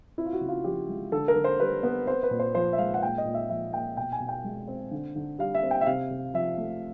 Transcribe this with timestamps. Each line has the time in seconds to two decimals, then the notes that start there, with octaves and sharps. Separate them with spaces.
0.18 C4 E4
0.26 F4
0.33 F#4
0.41 C#3
0.48 F4
0.64 F3 G4
0.89 G#3
1.12 D3 A4
1.28 A#4
1.36 D3
1.44 C5
1.59 G3 B4
1.83 B3
2.07 C4 C5
2.23 B4
2.31 A#2
2.39 C5
2.55 F3 C5
2.73 E5
2.78 G#3 F5
2.94 F#5
3.03 A#2 G5
3.18 D#5
3.25 A#2
3.34 E5
3.49 F3 E5
3.73 A#3 G5
3.97 B2 G5
4.12 G#5
4.20 B2
4.28 G5
4.44 G#3
4.68 C4
4.91 D3
5.16 D3
5.39 G3 F5
5.54 E5
5.63 C4
5.71 G5
5.81 E5
5.86 C3 F5
6.10 C3
6.34 F3 E5
6.57 A3